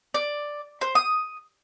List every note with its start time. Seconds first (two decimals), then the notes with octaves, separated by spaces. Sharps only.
0.14 D5
0.81 C5
0.95 D#6